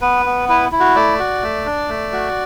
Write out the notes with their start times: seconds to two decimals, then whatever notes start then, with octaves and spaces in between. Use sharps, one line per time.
0.01 B3 B4
0.26 B3
0.49 E4 B4
0.72 E4
0.80 F#4
0.95 A3 D5
1.19 F#4
1.43 A3
1.66 D4
1.89 A3
2.13 F#4